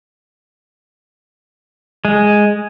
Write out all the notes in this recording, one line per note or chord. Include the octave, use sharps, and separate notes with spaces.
G#3